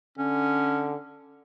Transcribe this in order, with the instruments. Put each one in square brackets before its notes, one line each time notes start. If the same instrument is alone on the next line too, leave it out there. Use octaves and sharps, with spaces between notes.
[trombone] D3 [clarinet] C#4